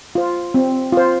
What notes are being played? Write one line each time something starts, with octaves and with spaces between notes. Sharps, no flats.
F4 C5
C4
F4 C5